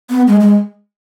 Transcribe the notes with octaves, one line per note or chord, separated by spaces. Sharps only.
B3
G#3
G#3